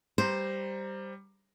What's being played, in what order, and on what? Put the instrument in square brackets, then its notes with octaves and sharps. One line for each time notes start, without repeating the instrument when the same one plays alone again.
[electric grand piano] G3 A#5 [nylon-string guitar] C5